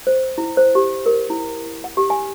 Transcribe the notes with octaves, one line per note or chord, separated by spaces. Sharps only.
C5
E4
C5
G4
A#4
E4
F#5
G4
G#5